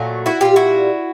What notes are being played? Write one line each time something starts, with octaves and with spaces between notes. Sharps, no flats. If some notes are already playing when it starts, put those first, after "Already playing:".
Already playing: A#2 F#3 A3
E4 F#4
A#2 G3 F4 G4
E4 F#4